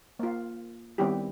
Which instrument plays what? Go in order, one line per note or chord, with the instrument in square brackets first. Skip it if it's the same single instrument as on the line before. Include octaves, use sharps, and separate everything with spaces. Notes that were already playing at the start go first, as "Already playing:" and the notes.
[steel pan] A#3 F4
D#3 G3 B3 C4 E4 G4